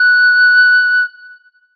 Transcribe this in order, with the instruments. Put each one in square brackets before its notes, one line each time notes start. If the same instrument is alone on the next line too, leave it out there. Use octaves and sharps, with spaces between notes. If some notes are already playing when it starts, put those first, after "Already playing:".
Already playing: [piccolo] F#6